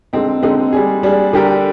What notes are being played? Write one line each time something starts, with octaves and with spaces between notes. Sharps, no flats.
D3 G#3 C4 D#4
D3 G#3 C4 D#4
G3 D4 G#4
G3 D4 G#4
D3 G3 D4 G4 A#4